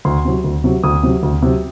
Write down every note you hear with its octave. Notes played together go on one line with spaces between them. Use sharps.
D2 C6
C3 F#3
D2
C3 F#3
D2 D#6
C3 F#3
D2
C3 F#3